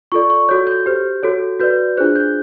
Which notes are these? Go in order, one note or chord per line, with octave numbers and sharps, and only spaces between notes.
F4 A4 D5 C#6
C#6
F#4 A4 C#5 G6
G6
G4 C5
F#4 A4 C#5
F#4 B4 D5 G6
D4 F4 G#4 C5 F#6
G6